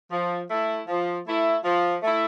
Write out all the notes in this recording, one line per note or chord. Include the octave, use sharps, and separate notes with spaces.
F3
A3 E4
F3
A3 E4
F3
A3 E4